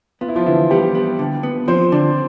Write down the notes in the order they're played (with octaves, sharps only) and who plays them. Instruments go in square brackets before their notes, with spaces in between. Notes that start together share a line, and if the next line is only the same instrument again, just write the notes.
[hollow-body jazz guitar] B3 [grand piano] F4
[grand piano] E4
F3 F4
[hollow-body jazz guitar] D3 [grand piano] E3 E4
[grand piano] G3 G4 [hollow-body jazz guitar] B3
[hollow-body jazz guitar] B3
D3
B3
[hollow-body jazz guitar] F3 [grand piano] C4 C5
[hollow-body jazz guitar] D3 [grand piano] D4 D5